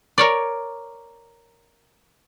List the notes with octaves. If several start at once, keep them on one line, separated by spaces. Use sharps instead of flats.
A#4 C#5 D5